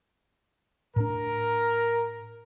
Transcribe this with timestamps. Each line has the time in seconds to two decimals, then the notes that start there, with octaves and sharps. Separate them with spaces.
0.96 A2 D4 A#4